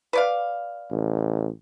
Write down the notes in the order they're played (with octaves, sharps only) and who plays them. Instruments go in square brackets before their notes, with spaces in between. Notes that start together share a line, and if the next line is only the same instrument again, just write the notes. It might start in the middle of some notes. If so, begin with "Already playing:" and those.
[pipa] B4 D5 F5
[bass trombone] A1